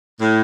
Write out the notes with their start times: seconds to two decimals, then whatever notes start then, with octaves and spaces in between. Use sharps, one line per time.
0.21 A2